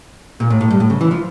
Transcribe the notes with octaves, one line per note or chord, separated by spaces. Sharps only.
A#2
A2
A2
G2
A2
C#3
E3
F3